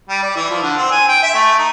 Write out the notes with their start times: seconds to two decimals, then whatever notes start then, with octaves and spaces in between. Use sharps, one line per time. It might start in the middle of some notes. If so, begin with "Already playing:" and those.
0.09 G3
0.23 D5
0.36 E3
0.50 F3
0.63 D3
0.77 C4
0.92 G#5
1.09 G5
1.23 E5
1.35 A3
1.58 D#4